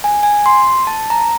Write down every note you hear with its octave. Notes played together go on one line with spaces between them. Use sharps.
G#5
G#5
C6
A5
A#5